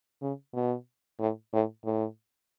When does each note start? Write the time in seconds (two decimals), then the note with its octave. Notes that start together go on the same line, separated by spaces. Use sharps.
0.22 C#3
0.54 B2
1.19 A2
1.53 A2
1.85 A2